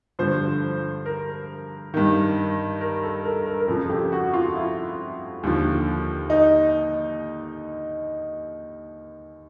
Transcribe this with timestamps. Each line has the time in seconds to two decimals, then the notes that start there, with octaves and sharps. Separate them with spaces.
0.19 G2 D3 F3 C5
1.06 A#4
1.94 G2 D#3
2.81 A#4
3.03 A4
3.25 A#4
3.46 A#4
3.60 A#4
3.68 F2 C#3 F3 A4
3.90 G4
4.12 F#4
4.34 F4
4.55 E4
5.43 D#2 D3 F3
6.30 D#4